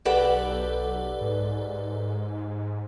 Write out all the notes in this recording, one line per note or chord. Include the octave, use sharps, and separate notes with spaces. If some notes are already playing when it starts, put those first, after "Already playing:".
B1 G4 A4 B4 D5 F#5
G#2